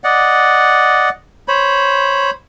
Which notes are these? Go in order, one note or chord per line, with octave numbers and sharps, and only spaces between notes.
D5 D#5 F#5
C5 C#5 B5